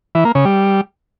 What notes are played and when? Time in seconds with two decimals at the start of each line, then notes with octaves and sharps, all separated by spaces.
0.15 E3
0.25 A#3
0.35 C#3
0.45 G3